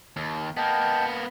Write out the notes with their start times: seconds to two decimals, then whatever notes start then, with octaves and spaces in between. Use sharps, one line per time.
0.16 D#2
0.57 A#3 B3 D#5 G5 A5